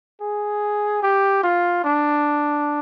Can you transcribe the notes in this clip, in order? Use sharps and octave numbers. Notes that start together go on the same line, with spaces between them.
G#4
G4
F4
D4